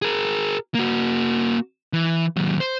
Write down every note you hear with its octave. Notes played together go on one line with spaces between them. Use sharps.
G#4 A#4
A#3 F#4
E3
D#2 F#3
C5